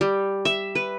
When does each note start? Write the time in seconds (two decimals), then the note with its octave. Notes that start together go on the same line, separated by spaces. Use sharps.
0.01 G3
0.45 E5
0.75 B4